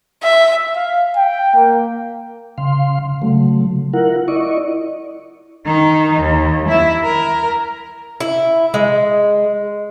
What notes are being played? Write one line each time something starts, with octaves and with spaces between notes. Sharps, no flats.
E5
F5
G5
A#3
C#3 F5 C6
C#3 F#3 A3
E4 F4 A#4 F#5
E4 D5 D#5 C#6
D#3 D#4
D#2
E4 E5
A#4
E4
G#3